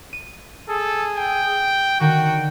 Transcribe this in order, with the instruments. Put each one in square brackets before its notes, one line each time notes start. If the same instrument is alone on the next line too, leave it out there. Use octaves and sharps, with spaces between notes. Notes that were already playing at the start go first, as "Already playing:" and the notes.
[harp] D#7
[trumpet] G#4 [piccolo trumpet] A4
[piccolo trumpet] G5
[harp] D3 D#3 [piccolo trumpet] F#4 [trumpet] G5